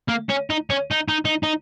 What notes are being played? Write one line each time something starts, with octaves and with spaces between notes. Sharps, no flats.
A#3
C#4
D#4
C#4
D#4
D#4
D#4
D#4